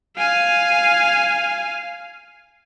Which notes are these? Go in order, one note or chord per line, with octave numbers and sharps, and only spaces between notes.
F5 G#5